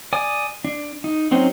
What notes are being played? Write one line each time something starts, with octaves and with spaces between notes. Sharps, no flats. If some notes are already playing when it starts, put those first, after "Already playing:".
D5 G#5 D#6
D4
D#4
F#3 C4 C#4 D#4 C5